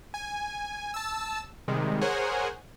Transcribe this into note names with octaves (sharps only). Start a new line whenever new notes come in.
G#5
A5 E6
C3 D#3 G3 G#3
G#4 A#4 C5 C#5 F#5 G#5